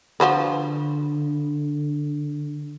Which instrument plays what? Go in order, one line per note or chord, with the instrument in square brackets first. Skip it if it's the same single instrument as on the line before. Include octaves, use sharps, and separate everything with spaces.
[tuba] D3 [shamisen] F3 F#4 B4